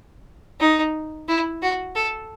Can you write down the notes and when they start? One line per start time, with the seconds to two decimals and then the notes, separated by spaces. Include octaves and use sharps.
0.60 D#4
1.28 E4
1.62 F#4
1.95 A4